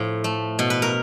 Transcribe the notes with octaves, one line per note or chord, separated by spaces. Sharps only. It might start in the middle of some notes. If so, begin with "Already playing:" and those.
Already playing: A2 F3
A3
B2
B4
A#4